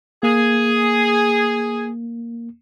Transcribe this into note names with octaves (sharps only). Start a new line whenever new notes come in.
A#3 G#4